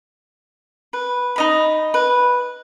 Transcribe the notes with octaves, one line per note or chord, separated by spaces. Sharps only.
B4
D#4 D#5 B5
B4